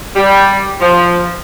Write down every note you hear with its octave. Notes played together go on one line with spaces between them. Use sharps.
G3
F3